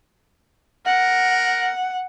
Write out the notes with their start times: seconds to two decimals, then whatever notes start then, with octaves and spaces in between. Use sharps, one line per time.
0.86 A#4 F#5